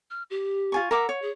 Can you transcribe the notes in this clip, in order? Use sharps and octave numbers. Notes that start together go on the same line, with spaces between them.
F6
G4
F4 G#5 C#6
A#4 E5 F#5 D6
C#5
G#4